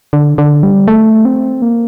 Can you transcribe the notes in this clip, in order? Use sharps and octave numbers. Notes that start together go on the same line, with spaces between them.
D3
D3
G3
A3
C4
A#3